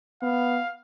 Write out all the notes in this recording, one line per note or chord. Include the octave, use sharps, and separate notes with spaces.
B3 F5